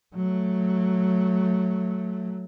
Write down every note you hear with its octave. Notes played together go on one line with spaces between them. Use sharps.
F#3 A3